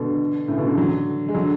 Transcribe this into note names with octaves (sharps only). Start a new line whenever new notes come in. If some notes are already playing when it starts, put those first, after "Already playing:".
Already playing: B2 D3
A2 C#3
B2 D3
C#3 E3
D3 F#3
G#3
D3 F#3